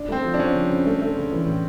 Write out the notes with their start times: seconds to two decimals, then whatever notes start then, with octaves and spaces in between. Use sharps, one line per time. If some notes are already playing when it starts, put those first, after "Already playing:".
Already playing: D4
0.09 A3 C4
0.24 F3
0.34 D4
0.39 F3 C#4
0.55 C#3
0.70 C#3
0.86 A3
1.01 A3
1.17 C#3
1.32 E3
1.47 A2